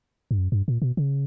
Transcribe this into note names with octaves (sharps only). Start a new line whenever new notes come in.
G2
F#2
G2
A#2
B2
C#3